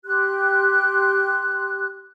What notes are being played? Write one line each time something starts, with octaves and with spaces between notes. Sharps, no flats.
G4 C6 F#6